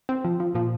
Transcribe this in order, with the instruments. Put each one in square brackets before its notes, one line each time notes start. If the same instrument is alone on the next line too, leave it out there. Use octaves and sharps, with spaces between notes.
[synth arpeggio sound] C4
F3
F3
[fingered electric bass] A#2 [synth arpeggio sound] F3